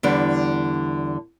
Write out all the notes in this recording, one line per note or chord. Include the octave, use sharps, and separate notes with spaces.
E2 D3 G3